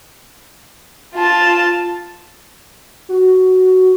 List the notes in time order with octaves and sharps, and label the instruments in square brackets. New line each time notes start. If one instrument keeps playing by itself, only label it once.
[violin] F4 A5
[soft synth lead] F#4